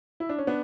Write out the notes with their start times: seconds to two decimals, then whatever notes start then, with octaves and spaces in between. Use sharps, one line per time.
0.20 E4
0.29 D4
0.38 C#4
0.47 B3 D4